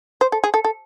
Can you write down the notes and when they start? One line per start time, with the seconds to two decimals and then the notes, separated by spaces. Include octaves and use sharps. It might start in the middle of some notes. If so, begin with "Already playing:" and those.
0.21 C5
0.32 A4
0.44 G#4
0.54 A4
0.64 A4